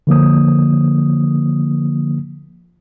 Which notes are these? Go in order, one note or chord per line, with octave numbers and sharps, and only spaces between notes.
D3 F3 A#3 D#6